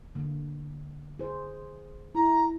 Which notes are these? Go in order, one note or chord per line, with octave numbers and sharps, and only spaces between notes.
D3 A#3
G#4 C5
E4 A#5